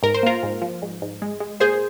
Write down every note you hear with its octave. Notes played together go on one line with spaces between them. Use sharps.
G#2 A#4
C5
A#3 F4 A#4
G#2
F3
G#2
G#2
G#3
G#3
A#2 G#4 C5